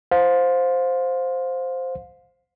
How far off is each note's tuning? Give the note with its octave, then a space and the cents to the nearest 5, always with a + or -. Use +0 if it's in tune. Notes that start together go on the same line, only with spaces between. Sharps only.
C5 +0 F5 +25